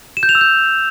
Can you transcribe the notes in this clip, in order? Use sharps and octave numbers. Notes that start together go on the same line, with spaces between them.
E7
G6
F7
E6
G6